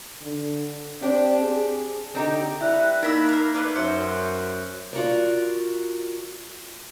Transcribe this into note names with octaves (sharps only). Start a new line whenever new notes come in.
D3
C4 D4 G4
G#4
D3 C4 D#4 G4
G3 E4 B4 D5 E5 F#5 F#6
A#3 D#4 A#4 B5 E6 F#6 B6
A#4 F5
A3 B3 D#4 D5
F#2 C5 C#5 E5 E6 C#7
F4 F#4 A#4 D5